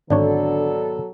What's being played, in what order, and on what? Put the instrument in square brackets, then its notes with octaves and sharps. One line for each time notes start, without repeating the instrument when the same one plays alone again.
[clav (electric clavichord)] G#1 D4 C#5 [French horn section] B2 F#3 A4 [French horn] D3 [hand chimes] D5